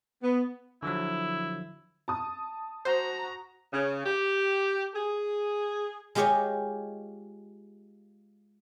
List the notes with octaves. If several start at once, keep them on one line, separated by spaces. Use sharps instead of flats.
B3
D3 F3 F#3 E4
A5 D#6
F#4 C5 A#5
C#3
G4
G#4
G#3 F4 G4 G#4 C#5 D#5